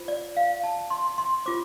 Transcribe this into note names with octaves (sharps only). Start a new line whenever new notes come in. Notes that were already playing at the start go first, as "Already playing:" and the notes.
Already playing: F4 C5
D5
F5
A5
C6
C6
F4 C5 D6